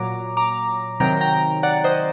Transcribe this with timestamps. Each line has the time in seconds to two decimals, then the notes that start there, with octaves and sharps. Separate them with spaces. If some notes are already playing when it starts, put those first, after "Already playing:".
Already playing: A#2 F#3 A#5 D6
0.37 A#5 D6
1.00 C3 D#3 F#3 G5 A#5
1.21 G5 A#5
1.63 D5 F#5
1.84 C5 D#5